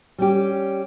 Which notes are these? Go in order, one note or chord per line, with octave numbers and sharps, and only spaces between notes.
G3 C#4 G4